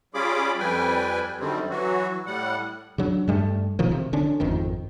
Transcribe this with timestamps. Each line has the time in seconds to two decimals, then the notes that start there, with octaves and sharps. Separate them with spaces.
0.14 G3 C#4 F4 G#4 B5 D6
0.59 F2 G3 B4 G5 G#5
1.40 F#2 D3 D#3 G3 C4
1.70 E3 F#3 F#4
2.26 A2 G3 F#5
2.98 C#3 F#3 D4
3.28 G2 G3 A3
3.79 A1 B2 D#3 F3
3.92 C3
4.13 D3 C#4 D4
4.40 G#1 F2 D#3